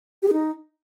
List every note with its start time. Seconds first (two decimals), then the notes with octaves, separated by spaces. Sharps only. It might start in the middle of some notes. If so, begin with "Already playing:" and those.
0.22 G4
0.28 G#4
0.33 D#4